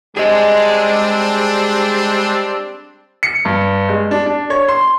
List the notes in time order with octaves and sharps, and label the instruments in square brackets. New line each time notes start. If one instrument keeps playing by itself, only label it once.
[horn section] G3 C4 D4 [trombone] G#3 [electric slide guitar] G#4 D#5
[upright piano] C#7
G2
G#3
D4
D4
C#5
C6